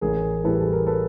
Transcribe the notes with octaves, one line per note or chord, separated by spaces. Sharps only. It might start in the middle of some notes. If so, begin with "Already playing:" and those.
A1 G#4 A#4
A2 E3 G3 A4 B4
A4
A#4
A4 B4